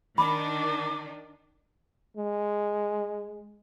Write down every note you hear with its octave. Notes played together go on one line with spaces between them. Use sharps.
D#3 D4 D#4 B5 D6
G#3